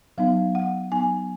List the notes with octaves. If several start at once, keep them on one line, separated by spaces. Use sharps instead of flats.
F#3 B3 D#4 F5
F#5
F#3 B3 D#4 G#5